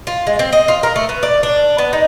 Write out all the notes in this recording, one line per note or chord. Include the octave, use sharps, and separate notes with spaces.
F4
G#3
C4
D#5
F4
A#4
A3
B3
D5
D4
B3
D#4